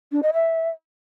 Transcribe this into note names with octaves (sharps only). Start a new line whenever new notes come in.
D4
D#5
E5